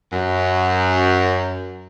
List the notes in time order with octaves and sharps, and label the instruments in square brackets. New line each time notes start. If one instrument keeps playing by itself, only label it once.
[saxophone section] F#2